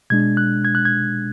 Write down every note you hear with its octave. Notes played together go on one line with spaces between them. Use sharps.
B2 G#3 D4 G#6
F#6
G#6
F#6
G#6